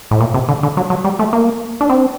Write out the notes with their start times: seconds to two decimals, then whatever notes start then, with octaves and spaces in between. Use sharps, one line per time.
0.11 A2
0.21 A#2
0.34 C3
0.48 D3
0.63 D3
0.77 F#3
0.90 F#3
1.04 G3
1.19 A3
1.33 A#3
1.81 D4
1.89 C4